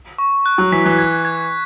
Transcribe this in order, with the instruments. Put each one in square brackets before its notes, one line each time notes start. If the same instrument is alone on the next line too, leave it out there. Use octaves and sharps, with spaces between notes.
[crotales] C#6
F#6
[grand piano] F#3
[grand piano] E3 [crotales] B6
[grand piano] E3
[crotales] G#6
G#6